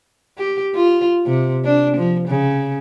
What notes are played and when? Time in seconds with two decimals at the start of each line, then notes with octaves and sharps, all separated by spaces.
0.38 G4
0.75 F4
1.26 C3
1.65 D4
1.97 F3
2.28 C#3